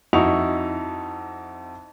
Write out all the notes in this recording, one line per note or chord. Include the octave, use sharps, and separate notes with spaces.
F2 D#4 E4 F#4 C#6 F7